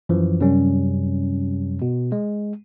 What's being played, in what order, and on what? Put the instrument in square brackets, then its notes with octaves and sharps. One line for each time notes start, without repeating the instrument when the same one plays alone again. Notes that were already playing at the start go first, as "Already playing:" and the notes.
[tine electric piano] F#2 E3 F3
F#2 C3 G3 C#4
B2
G#3